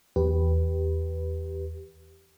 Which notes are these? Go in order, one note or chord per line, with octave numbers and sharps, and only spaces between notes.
E2 G4 B4